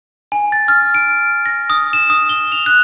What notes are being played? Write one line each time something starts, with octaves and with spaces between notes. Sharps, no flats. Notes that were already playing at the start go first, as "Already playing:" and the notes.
G#5
A6
F6
D7
A#6
D#6
E7
D#6
G7
F7
F#6